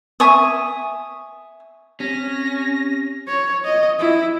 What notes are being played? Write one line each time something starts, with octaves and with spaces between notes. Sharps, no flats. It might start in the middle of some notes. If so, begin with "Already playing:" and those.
E5 G#5 C#6 D#6
C4 C#4 G4 A#6 B6
C#5
D#5
E4